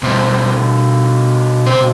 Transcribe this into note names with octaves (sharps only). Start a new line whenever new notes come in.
B2 G3 C4 C5
C4 C5